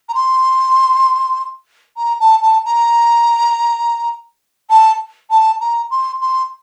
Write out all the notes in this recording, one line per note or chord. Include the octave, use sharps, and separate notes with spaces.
A#5
C6
A#5
A5
A5
A#5
A5
A5
A#5
C6
C6